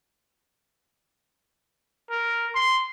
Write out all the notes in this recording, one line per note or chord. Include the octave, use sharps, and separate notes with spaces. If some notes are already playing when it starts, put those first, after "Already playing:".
A#4
C6